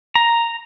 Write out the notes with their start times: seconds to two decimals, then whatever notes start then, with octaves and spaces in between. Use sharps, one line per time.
0.15 A#5